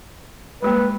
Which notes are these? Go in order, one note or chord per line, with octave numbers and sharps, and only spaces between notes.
G3 G#3 A#3 B4